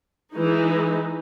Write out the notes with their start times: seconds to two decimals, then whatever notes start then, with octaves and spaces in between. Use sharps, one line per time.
0.35 E3 G#3 D#4